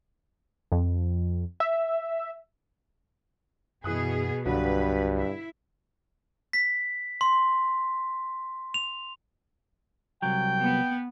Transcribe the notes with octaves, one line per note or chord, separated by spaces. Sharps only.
F2
E5
F#2 B2 E3 B3 G#4 D#6 F#6
C2 G2 B2 D3 F#3 B4
E4
B6
C6
F7
C2 F#3 G5
B3